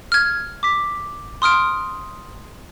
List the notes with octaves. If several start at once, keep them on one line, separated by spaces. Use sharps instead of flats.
F6 G#6
D6 B6
C6 D#6 F6 D7